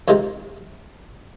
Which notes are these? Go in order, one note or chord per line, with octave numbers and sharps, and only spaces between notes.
F2 C3 D#3 G#3